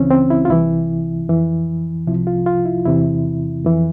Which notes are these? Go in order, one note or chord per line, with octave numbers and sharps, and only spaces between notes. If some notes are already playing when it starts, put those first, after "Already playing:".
Already playing: C#2 C#3 E3 C4 C#4
C4
E4
F4
C2 C3 E3 E4
F2 E3
C2 C3 F3 E4
F4
F4
E4
E2 C3 E3 E4
F2 E3